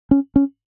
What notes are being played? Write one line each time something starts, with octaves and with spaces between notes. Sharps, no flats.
C#4
C#4